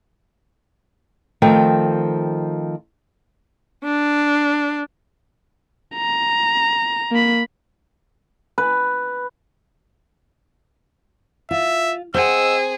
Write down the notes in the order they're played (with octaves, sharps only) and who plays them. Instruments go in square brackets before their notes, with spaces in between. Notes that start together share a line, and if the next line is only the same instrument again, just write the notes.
[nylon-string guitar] D#3 F3 A3 C4 G5
[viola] D4
[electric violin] A#5
A#3 B5
[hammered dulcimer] B4
[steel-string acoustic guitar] F4 [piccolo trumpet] E5
[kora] C4 [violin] G#4 [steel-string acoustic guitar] D#5 F#5 [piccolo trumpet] E6